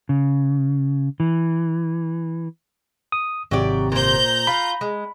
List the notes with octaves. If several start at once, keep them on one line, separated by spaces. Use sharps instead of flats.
C#3
E3
D#6
G#1 C3 F#3 G4 D5
A#2 C5 A#5 G6
F4 B5
G#3